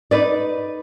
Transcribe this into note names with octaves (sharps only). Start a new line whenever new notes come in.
D#4 B4 D5